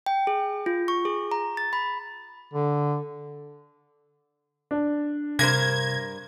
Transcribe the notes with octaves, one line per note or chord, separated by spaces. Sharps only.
G5
G#4
F4
C#6
G#4
A#5
A6
B5
D3
D4
G2 C3 A#4 C5 G#6 A#6